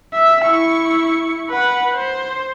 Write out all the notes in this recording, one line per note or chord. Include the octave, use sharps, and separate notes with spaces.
E5
E4 C#6
B4 F#5
C5